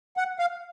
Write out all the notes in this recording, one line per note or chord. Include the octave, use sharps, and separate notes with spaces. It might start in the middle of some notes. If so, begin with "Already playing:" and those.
F#5
F5